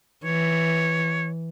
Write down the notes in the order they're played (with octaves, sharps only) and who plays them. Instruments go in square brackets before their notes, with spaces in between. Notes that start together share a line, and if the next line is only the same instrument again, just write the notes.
[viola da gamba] E3 [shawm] C#5